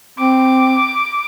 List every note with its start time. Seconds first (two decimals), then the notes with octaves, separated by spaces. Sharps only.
0.19 C4 D6